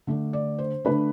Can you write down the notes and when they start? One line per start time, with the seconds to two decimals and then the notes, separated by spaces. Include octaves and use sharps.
0.07 D3 A3 D4
0.33 D5
0.59 C5
0.85 D3 A3 D4 B4